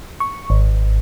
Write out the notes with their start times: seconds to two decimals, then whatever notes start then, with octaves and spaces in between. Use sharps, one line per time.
0.20 C#6
0.50 G#1